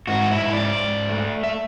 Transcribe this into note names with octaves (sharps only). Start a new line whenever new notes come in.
G#2 F#4
E4
G#2
D5
G#2
A3
E5